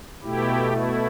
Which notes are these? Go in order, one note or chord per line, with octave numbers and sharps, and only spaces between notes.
B2 A3 E4 G4
E4